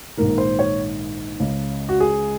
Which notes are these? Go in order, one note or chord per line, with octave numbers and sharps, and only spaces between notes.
A#1 G#2 D#3 A#4
C5
C#5
C#2 C#3
F#4
G#4